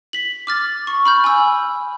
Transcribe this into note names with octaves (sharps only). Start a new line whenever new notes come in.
B6 F#7
D6 F6 A6
C#6
B5 F6 G6
G#5 B5 E6